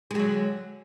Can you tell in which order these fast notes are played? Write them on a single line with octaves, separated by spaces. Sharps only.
G#3 F#3 D3